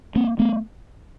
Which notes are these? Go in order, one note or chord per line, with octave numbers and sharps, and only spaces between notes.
A#3 C4
A3 B3